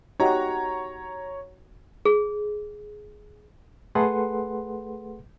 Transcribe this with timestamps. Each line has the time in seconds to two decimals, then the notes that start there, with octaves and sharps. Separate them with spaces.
0.20 D#4 F#4 G4 C#5 A#5
2.05 G#4
3.95 A3 G#4 A4 B4 F#5 C6